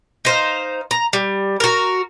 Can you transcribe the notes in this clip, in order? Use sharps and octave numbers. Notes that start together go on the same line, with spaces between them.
D#4 C5 F5
A#5
G3
F#4 A#4